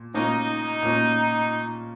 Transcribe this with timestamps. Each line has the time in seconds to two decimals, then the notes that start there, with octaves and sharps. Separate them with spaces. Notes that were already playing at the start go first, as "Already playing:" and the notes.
Already playing: A#2 A#3
0.14 A#2 A#3 C#4 D#4
0.83 A#2 A#3 C#4